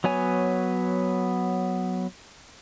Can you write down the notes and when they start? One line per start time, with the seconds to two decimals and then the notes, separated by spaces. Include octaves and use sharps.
0.04 F#3 B3 C#5 G#5